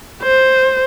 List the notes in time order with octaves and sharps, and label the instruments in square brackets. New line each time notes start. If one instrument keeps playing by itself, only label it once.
[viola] C5